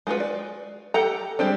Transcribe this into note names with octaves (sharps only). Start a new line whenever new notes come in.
G#3 F4 F#4 B4
D5
G4 A4 F#5 A#5
G3 G#3 C4 D4